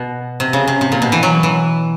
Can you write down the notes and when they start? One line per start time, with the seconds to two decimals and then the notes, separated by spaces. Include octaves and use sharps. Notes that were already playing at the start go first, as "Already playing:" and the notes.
Already playing: B2
0.40 C3
0.53 C#3
0.68 C3
0.81 C3
0.92 A#2
1.02 B2
1.12 E3
1.23 F#3
1.43 E3